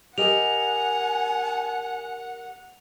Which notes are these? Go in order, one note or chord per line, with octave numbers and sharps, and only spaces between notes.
G4 A#4 D#5 F#5 G#5 F7